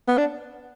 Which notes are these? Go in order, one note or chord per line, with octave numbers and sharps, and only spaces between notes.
B3
D4